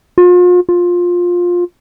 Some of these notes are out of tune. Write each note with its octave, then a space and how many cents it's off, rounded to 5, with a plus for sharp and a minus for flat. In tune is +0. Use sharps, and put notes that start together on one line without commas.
F4 +40
F4 +15